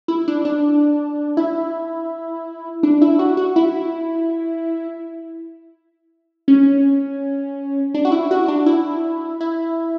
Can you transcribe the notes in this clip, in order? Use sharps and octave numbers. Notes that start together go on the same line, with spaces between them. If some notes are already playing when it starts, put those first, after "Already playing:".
E4
D4
D4
E4
D4
E4
F#4
F#4
E4
C#4
D4
F#4
E4
F#4
D4
E4
E4